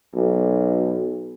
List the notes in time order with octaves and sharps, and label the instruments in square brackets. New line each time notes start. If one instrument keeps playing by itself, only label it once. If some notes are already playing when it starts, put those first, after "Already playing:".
[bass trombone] B1